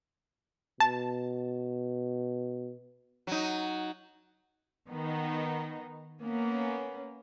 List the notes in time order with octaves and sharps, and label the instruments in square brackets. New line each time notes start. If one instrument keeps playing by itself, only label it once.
[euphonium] B2 [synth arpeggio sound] A5
[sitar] F#3 D#4
[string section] D#3 B3 D#4
A#3 B3 C#4